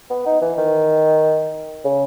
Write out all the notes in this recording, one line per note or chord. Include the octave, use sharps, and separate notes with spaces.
B3
D#4
E3
D#3
C#3